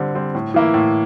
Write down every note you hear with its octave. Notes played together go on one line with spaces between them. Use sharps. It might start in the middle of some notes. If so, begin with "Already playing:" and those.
Already playing: D3 G3 C4
G3 C4
A2
E3 A#3 E4
A2